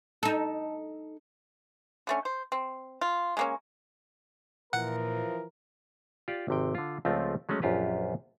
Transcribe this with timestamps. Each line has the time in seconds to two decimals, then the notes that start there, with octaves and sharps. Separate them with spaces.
0.23 D#4 A4
2.07 D3 A3 C#4
2.25 C5
2.52 C4
3.01 F4
3.37 G#3 A#3 C#4
4.73 A#2 E3 F3 A#4 F#5
6.28 F4 G4 D5
6.48 G#1 C3 G5
6.75 D3 F4
7.05 C#2 F3 A3 C4 F4
7.49 F#3 G#3 A3 C#4
7.62 A#1 F#2 F4 G4 B4